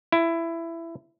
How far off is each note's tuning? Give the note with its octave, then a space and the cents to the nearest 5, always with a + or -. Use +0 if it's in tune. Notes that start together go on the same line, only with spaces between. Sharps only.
E4 +15